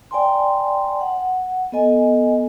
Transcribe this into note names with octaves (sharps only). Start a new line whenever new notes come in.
D5 G5 G#5 A#5 C6
F#5
B3 A4 D#5 G#5